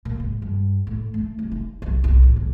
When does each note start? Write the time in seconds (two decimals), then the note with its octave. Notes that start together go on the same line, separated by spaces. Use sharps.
0.05 A#2
0.20 G#2
0.42 G2
0.87 A2
1.14 A3
1.39 C2
1.52 D#4
1.82 B1
2.04 B1
2.23 A1
2.36 B1